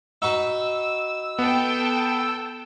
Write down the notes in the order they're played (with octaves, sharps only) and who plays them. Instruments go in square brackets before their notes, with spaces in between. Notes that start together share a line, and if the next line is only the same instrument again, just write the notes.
[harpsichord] D#4 F#4 B4 [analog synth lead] E6
[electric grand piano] B3 [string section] A4 G5